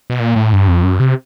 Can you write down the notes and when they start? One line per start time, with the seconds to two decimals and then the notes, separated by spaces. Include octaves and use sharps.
0.10 B2
0.20 A#2
0.36 A2
0.53 G2
0.68 F2
0.84 F#2
1.00 C3